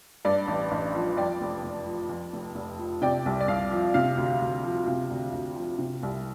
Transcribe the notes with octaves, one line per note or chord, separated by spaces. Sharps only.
G2 D5
A1
A1
F3
F2 D5 G5
F1
F1
F3
F2
F1
F1
F3
C3 D5 G5
C2
D5
C2 F5
F3
C3 F5
D2
D2
F3
C3 F5
D2
D2
F3
C3
C2